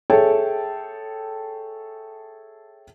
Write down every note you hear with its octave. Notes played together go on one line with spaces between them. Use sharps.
G#4 A4 C#5 E5 G5 A5